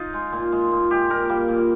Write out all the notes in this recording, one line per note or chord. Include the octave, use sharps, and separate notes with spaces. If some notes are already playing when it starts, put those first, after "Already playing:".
Already playing: D#4 F4
G#3
A#2
G#3
A#2
G#3 G4
A#2 A#4
G3 A#3
A#2